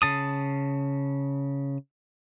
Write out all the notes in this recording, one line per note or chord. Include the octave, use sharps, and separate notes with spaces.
C#3 A5 D#6